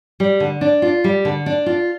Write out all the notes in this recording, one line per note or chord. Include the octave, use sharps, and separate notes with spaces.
G3
D3
D4
F4
G3
D3
D4
F4